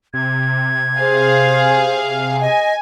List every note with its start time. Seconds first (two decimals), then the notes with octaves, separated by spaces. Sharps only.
0.14 C3 G#6
1.00 G#4 C5 F5
2.41 D#5 G#5